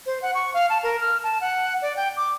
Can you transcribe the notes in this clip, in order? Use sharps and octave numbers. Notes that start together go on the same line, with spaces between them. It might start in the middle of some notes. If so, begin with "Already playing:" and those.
C5
F#5
C#6
F5
A5
A#4
F6
A5
F#5
D5
G5
D6